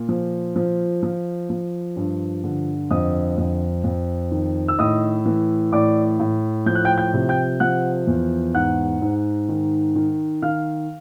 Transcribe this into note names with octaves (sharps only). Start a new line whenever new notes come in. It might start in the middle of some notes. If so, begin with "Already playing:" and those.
Already playing: A#2
F3
F3
F3
F3
G2
D3
F2 D#5 D#6
F2
F2
D#3
E6
A2 D#5 D#6
E3
A2 D5 D6
A2
F3 G6
F#6
G5 G6
G5 G6
C3
G5 G6
F3 F#5 F#6
E2
G#2 F#5 F#6
G#2
D#3
D#3
D#3 F5 F6